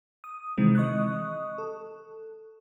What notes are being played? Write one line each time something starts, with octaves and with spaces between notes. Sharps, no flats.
D#6
C3 D#3 E3 G#3 C4
D#5 C#6 D#6 F#6
A4